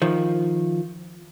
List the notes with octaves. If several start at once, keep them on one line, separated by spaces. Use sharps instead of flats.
D#3 F3